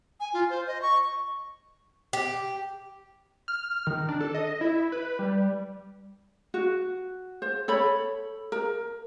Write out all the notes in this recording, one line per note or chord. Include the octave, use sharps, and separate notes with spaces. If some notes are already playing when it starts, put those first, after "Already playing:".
G#5
F4
C5
D#5
C#6
G4
F6
D#3
D4
A4
D#5
E4
B4
G3
F#4
C5
A4 C#5 B5
A#4